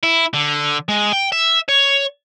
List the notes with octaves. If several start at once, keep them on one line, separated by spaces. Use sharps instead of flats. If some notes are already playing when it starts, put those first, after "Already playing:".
E4
D3
G#3
G5
E5
C#5